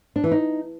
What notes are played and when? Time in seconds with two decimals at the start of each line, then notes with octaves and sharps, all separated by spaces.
0.16 D4
0.24 E3
0.31 D#4